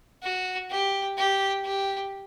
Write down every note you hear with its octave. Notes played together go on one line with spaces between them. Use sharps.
F#4
G4
G4
G4